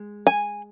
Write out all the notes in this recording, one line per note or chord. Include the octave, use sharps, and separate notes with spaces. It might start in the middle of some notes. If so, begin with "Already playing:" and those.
Already playing: G#3
G#5